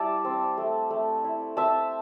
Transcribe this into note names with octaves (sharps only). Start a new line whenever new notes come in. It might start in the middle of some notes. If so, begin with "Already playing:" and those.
Already playing: G3 E4 D5 E5 A5
C4
A3
A3
E4
C4 E5 A5